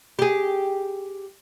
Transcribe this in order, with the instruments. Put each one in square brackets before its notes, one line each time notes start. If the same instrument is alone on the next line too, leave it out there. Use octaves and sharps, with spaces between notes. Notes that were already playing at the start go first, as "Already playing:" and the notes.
[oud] G4 G#4